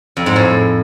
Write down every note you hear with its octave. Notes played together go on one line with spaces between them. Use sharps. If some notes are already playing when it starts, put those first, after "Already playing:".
F2
G#2
A2